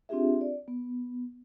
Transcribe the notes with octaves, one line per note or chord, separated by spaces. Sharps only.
C4 D4 F4 G4 G#4 E5
D5
B3